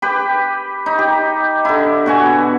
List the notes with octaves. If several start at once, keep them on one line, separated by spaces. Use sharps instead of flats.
G4 B4
D#4
G4
D3 E4
B2 F#4 G#5